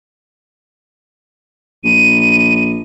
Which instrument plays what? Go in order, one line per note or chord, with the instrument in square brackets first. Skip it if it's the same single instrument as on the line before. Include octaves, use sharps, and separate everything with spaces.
[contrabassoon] A#1 [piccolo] D#7